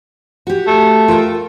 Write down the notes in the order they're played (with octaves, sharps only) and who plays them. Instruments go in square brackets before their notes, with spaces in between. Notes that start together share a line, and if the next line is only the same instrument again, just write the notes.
[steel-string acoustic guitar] F#4 G4
[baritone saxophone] A3
[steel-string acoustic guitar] F4 A#4 G5